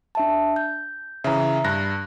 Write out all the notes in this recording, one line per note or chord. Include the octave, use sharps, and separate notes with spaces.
D4 E5 A5
G6
C#3 E3 E5 A#5
G2 F#6 A#6